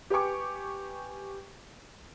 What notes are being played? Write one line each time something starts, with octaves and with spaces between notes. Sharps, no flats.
G4 B4 G5 G#5 C#6 D6